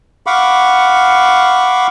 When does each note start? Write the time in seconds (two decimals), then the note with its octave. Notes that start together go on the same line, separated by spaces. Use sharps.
0.27 F5 F#5 B5 C#6 D6